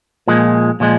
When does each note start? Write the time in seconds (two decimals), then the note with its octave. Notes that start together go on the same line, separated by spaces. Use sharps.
0.28 A#2 F3 G#3
0.80 A#2 F3 G#3